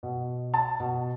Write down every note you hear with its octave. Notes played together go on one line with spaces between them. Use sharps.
B2
A5
B2